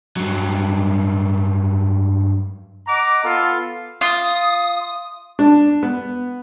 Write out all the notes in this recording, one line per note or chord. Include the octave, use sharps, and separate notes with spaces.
G2 F#3
D#5 F#5 A#5 D6
B3 F4 A4
F4 D#6
D4
B3